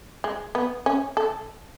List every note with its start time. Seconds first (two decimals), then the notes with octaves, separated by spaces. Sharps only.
0.24 G#3
0.55 B3
0.86 C#4
1.17 A4